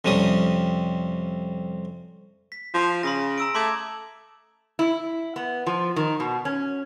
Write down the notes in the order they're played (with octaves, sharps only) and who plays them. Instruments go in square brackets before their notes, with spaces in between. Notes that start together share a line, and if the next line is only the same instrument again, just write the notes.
[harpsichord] F2 C3 G3 C#4 D#6
[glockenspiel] B6
[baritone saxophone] F3
[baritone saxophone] C#3 [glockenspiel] C6 D#6 A#6
[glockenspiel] A#5 E6 D7
[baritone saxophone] A3 [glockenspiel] C6 D6 G#6
[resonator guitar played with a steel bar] E4
B3
F3
D#3
B2
C#4